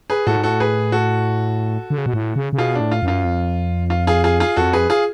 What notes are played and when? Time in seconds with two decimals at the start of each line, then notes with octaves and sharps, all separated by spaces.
0.10 G#4 B4
0.27 A2 F#4 A4
0.36 G#2
0.43 A2 F#4 A4
0.60 G#4 B4
0.92 F#4 A4
1.90 D3
1.98 C#3
2.06 B2
2.14 A2
2.36 C#3
2.53 C#3
2.58 B2 F4 G#4
2.75 A2 D4
2.91 F4
3.03 F#2
3.08 F4
3.25 F2
3.90 F4
4.07 F4 G#4
4.24 F4 G#4
4.40 F4 G#4
4.56 F2 F#4 A4
4.73 G#4 B4
4.90 F4 G#4